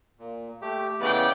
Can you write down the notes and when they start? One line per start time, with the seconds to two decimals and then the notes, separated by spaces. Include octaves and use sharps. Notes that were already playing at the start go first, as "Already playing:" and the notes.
0.19 A#2
0.62 A3 G4
1.00 C#3 E3 B3 D5 G5